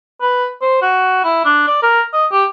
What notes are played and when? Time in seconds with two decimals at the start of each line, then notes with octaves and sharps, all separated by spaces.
0.22 B4
0.62 C5
0.82 F#4
1.24 E4
1.45 D4
1.67 D5
1.83 A#4
2.13 D#5
2.32 G4